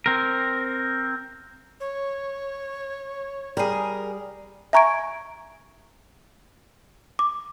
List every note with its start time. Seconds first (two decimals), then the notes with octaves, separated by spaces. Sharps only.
0.06 C4 A#4
1.80 C#5
3.57 G3 G#4 A#4
4.73 E5 G#5 A#5 C#6 G#6 D7
7.19 D6